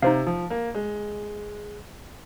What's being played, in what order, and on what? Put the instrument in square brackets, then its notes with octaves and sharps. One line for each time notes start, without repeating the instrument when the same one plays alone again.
[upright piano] C3 [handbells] D#4 C5 F5
[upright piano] F3
A#3
G#3